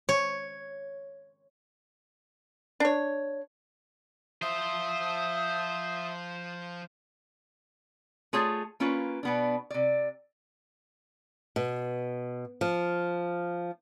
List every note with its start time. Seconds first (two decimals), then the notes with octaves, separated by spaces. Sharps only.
0.09 C#5
2.80 D4 C#5
4.42 F3 C5 E5 C6 D#6
8.33 A3 F4 G#4 C#5 A5
8.80 A#3 C#4 F4 B4
9.23 B2 B3 D4
9.71 C3 D5
11.56 B2
12.61 F3